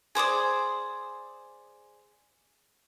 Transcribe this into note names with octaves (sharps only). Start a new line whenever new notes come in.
G#4 C5 D5 D#6